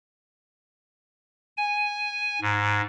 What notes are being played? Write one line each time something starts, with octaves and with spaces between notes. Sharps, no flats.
G#5
G#2